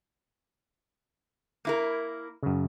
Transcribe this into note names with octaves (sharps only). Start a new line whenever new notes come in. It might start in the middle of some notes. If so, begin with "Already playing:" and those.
A#3 E4 A#4
F#2 C#3